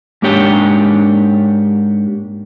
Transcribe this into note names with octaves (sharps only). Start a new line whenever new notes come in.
G#2 A#3 D4 G4 C#5 G5